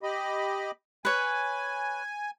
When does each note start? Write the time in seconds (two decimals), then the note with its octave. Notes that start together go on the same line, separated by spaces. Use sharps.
0.03 G4 D#5 B5
1.05 B4 C#5 G#5